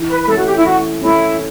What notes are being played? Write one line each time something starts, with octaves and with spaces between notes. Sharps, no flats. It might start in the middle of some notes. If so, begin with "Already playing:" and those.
Already playing: E3
B4
B4
A3 C#4 A4
F#4
G4
E4
E3 F#4
A3 C#4 E4